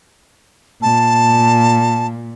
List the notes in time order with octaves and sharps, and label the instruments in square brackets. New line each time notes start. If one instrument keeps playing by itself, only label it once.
[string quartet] A#2 [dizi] A5